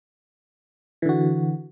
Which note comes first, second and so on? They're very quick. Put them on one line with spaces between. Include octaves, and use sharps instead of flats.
E3 D3 F#4